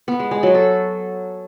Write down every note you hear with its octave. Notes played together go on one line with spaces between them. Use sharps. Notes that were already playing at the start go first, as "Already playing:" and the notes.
B3
G#3
G#3
F#3
A4